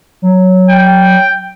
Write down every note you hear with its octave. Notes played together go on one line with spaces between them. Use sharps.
F#3
G5